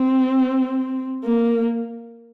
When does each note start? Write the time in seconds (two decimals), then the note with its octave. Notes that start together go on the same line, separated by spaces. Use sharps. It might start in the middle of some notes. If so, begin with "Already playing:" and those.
Already playing: C4
1.24 A#3